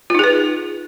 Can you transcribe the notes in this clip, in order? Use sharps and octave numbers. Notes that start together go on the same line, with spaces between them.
D#4 F4 G#4 B4